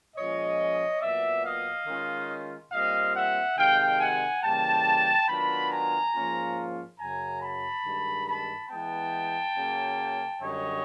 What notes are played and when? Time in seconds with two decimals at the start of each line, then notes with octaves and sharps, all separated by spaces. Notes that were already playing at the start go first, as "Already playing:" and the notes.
0.16 A#2 F3 G#3 C#4 C#5 D#5
1.01 A#2 F#3 B3 D5 E5
1.45 D#5 F5
1.87 D#3 G#3 C#4 F4
2.72 A#2 G3 C4 D#5 F5
3.15 E5 F#5
3.57 C3 D#3 G#3 F5 G5
4.00 F#5 G#5
4.43 C#3 E3 G3 A#3 G5 A5
5.28 D#3 F#3 B3 D4 F4 A5 B5
5.71 G#5 A#5
6.14 G#2 F3 A#3 C#4 F4
6.99 F#2 C#3 F#3 G#5 A#5
7.41 A5 B5
7.85 G2 D#3 G#3
8.27 A5 B5
8.70 E3 G#3 B3 G5 A5
9.56 C#3 F#3 A#3
10.41 F#2 D3 G3 C#5 D#5